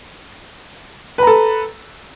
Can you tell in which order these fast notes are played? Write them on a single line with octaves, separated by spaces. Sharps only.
B4 A#5 A4